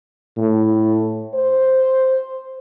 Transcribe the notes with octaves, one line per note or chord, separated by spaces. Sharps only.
A2
C5